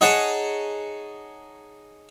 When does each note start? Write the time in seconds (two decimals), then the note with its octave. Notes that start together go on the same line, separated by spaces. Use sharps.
0.01 D#4 G#4 C#5 F#5 A5 A#5